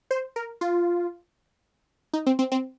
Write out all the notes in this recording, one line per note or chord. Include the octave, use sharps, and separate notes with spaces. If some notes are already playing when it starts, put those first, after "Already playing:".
C5
A#4
F4
D#4
C4
C4
C4